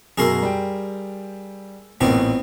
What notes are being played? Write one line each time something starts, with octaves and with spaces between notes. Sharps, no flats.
F#2 B2 G#4 A#4 C6 E6
G3 G5
A1 A#2 B3 C4 F#4